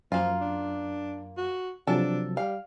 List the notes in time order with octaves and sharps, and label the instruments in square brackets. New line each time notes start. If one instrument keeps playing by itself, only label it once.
[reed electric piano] F#2 [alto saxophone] F3 [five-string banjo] A#3 F4
[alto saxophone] D4
F#4
[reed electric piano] C3 F3 F#3 [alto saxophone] D4 [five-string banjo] A4
[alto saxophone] G3 [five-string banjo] F5